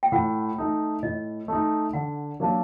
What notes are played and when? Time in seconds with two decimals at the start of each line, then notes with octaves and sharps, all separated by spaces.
0.03 G5
0.12 A2 F#5
0.58 A3 D#4
1.03 A2 D#5
1.48 A3 D#4
1.93 D3 F#5
2.40 F#3 A#3 D4